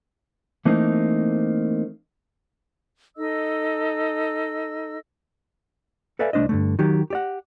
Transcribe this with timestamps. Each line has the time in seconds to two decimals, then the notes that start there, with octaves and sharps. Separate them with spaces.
0.65 E3 A3 A#3 C4 D#4
3.17 D#4 A4 D#5 E6
6.19 A4 B4 D5 E5 F5 G#5
6.33 C2 A3 D4 C5 D#5
6.49 G2 D3 A3
6.79 D#3 F#3 G4
7.10 G4 D5 F#5